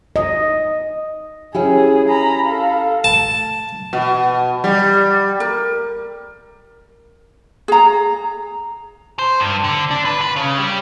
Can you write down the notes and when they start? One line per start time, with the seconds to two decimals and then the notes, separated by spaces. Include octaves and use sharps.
0.16 D#5
1.54 C#4 E4 G4 G#4
2.09 A#5 B5
2.46 A4 F5
3.04 A5
3.93 B2
4.64 G3
5.40 A#4
7.68 G#4 A#5
9.19 C5
9.40 G2
9.64 D3
9.91 D4
10.05 B4
10.21 B4
10.36 C#3
10.58 G3